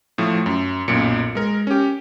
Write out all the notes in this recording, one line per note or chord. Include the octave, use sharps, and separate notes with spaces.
A2 F3 A3
F#2
B1 F#2 A#2 C#7 D7
G#3 A#4
C#4 G4